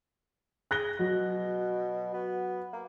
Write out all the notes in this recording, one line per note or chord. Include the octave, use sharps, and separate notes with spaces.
G#4 F#6 A#6 G7
B2 F#3
B3
A#3